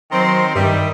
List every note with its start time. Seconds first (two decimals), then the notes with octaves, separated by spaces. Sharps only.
0.12 D#3 F#3 C4 A#5 C6
0.56 G2 D#3 G3 E5 D#6